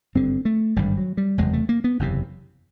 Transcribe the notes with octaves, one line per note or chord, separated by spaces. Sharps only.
G#1 G2 D3 C4
A3
G#1 G2 D3 G3
F#3
G3
F#1 E2 C3 G#3
A3
A#3
B3
F#1 E2 C3